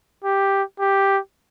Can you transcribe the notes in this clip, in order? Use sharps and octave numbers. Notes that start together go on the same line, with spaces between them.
G4
G4